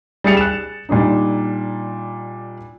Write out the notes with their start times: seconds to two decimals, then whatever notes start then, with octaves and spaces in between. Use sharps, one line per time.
0.24 G3 G#4 A6 C#7 F7
0.37 F#6 E7
0.89 A#2 G3 D4 D#4